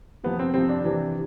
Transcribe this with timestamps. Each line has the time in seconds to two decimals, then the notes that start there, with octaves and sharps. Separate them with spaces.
0.24 C3 F3 B3
0.39 C4
0.54 C3 F3 C4
0.69 D4
0.84 C3 E3